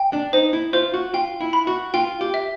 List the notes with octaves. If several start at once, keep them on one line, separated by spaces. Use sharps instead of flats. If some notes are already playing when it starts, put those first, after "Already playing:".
Already playing: G5
D4
D#4 C5
E4
F4 C5
F#4
F4 G5
E4
B5
F#4
F4 G5
G4
E5